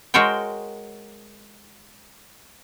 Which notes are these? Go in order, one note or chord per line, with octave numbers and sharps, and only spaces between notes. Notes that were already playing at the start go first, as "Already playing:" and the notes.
G#3 F#4 A#4 C5 C#5 G5